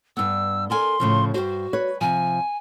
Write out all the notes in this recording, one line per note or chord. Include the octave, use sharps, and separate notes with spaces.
G2 B3 E6
A4 A#4 G#5 C6
A2 C#3 F3
G2 F#4 C5
B4 C#5
C3 F3 G#5